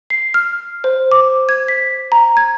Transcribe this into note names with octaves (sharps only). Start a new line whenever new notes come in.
C7
F6
C5
D6
G#6
B6
A#5
G#6